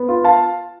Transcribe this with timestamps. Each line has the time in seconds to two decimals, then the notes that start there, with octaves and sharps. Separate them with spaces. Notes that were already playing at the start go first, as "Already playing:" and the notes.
Already playing: B3
0.09 F4
0.24 F5 A5